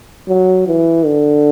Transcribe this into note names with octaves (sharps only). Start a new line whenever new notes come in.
F#3
E3
D3